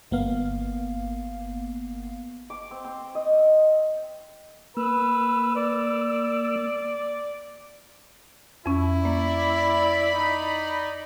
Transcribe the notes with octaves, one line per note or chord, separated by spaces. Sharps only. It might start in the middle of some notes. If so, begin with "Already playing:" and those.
G1 A#3 B3 F5
D6
C4
C4
D#5
A#3 B4 E6
D5
F2 C#4 E4
A#3 D5 B5
D#4